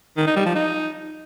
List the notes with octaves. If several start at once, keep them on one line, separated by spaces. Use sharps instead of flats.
D#3
D#4
G3
F3
D#4